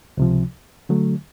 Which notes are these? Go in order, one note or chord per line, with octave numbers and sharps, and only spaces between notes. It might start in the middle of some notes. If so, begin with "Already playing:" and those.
C#2 C3 F3
D3 F#3 A3